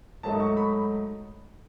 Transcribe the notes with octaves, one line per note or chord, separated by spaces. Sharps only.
G#2 F#3 A3 D#4 A5
C#6
B5